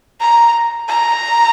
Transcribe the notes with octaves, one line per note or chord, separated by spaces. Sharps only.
A#5
A#5